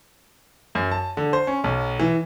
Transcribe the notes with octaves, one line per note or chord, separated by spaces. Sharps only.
F#2
A5
D3
C5
C#4
B1
E3